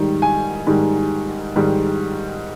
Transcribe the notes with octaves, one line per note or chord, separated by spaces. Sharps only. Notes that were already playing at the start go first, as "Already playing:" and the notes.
Already playing: G#2 D#3 G3
G#5
G#2 D#3 G3
G#2 D#3 G3